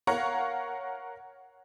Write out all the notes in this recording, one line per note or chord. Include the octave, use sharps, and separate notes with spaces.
A#4 C#5 F5 F#5 A#5 C#6